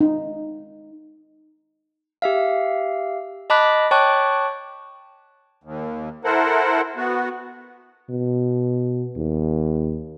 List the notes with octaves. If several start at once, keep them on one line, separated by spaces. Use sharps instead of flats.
D#4
G4 E5 F5
D#5 A5 B5 D6 F#6 B6
C#5 G5 A5 C#6 D6 F#6
D#2
E4 A4 A#4 C5 F#5
B3 F#4
B2
D#2